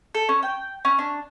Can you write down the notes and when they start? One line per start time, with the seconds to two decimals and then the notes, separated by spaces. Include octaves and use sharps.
0.15 A4
0.29 C#4
0.43 G5
0.85 C#4
0.99 D4